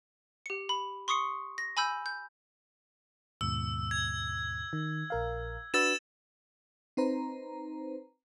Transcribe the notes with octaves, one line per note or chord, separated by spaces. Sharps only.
G4 C#7
B5
C6 C#6 D#6 C7 C#7
A#6
G#5 B5 E6 G6
G6
D#2 G#2 B2 E6
G#6
D#3
A#1 A#4 F5
D4 F#4 B4 E6 A6 E7
C4 D#4 B4 C5 A#5